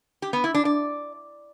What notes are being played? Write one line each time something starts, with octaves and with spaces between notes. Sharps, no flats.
G4
B3
E4
D4
D5